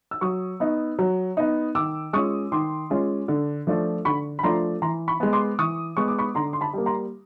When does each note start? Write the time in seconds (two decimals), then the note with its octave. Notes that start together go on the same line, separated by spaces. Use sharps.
0.11 E6
0.21 F#3 C#6 D#6
0.60 B3 D#4
0.99 F#3
1.37 B3 D#4
1.75 D#3 D6 E6
2.13 G#3 C#4 F4 C#6 D#6
2.52 D#3 C6 D6
2.90 G#3 C#4 F4
3.28 D3
3.67 F3 A3 D4 F4
4.05 D3 B5 C#6
4.39 B5
4.43 F3 A3 D4 F4 A#5 C6
4.82 E3 A#5 C6
5.08 B5 C#6
5.20 G#3 B3
5.33 C6 D6
5.59 E3 C#6 D#6
5.97 G#3 B3 C#6
6.08 D6
6.19 B5 C#6
6.35 D3 A#5 C6
6.53 C6
6.61 A5 B5
6.73 G3 A#3
6.86 A#5 C6